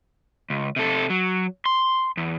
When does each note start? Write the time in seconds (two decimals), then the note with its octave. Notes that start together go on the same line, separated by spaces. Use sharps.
0.50 C#2
0.76 C3 A4
1.10 F#3
1.66 C6
2.17 E2